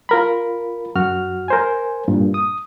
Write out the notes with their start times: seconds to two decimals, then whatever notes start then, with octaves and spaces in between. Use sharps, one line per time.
0.09 F4 A#4 B5
0.95 F#2 F#4 F6
1.48 A#4 C5 G#5
2.08 G2 A#2
2.34 D#6